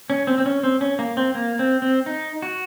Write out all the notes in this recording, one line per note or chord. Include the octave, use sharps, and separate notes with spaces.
C#4
C4
C4
C#4
C4
C#4
A#3
C4
A#3
C4
C4
D#4
F#4